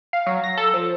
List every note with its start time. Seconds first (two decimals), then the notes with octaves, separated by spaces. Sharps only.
0.13 F5
0.27 F#3
0.44 A#6
0.58 A4
0.74 F3